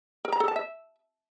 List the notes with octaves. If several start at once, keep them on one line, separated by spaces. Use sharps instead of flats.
A#4
A#5
A4
A5
E5